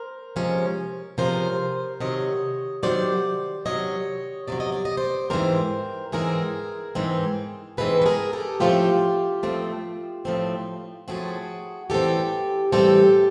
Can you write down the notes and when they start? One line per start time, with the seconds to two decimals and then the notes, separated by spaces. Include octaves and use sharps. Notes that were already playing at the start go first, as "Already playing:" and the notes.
Already playing: A#4 C5
0.36 C3 F3 G#3 C#4
1.18 C3 F3 G#3 C#4 A#4 C5
2.00 C3 D#3 F#3 C#5 D#5
2.83 C3 D#3 F#3 C5 D5
3.65 C3 D#3 F#3 C#5 D#5
4.48 C3 D#3 F#3 D5
4.60 D#5
4.72 D5
4.85 D#5
4.97 C5 D5
5.30 G#2 E3 G#3 C4 A#4 C5
6.12 G#2 E3 G#3 C4 G#4 A#4
6.95 G#2 E3 G#3 C4
7.77 G#2 E3 G#3 C4 A4 B4
8.02 B4
8.06 G#4 A#4
8.33 G4 A4
8.60 A2 F3 A3 C4 F4 G4
9.43 A2 F3 A3 C4
10.25 A2 F3 A3 C4
11.08 A2 F3 A3 C4 F#4 G#4
11.90 A2 E3 G3 C4 G4 A4
12.72 A2 E3 G3 C4 G4 A4